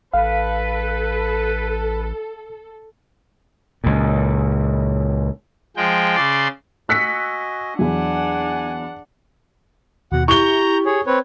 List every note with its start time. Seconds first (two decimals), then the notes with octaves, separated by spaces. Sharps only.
0.14 A1 A4 B4 F5
3.84 C#2 A#2
5.77 F3 G#3 G5
6.16 C#3 D5 C6
6.89 F#4 D#5 G#5 E6 F#6 B6 C#7
7.79 E2 F#3 D4 F#5 G#5
10.12 D#2 B2 F#4 F#5
10.28 E4 G4 A#5 C#6 G6 G7
10.86 G#4 C#5
11.07 C4 B4 C#5